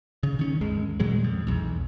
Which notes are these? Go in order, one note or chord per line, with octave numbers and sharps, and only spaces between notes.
C#3
D#3 C#4
G#1 D#2 G#3
A#2 D#3 F#3 G#3
F2
B1 E2